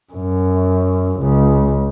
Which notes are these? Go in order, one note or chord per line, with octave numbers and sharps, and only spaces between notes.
F#2
C#2